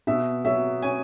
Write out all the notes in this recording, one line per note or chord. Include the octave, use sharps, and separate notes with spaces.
B2 E5
F#3 E5
C#4 G#5